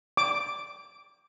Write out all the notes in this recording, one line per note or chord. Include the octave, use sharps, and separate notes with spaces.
D6